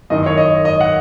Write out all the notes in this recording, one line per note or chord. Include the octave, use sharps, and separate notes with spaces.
F#2 D#3 D#5
C#5
D#5
D#5
F#5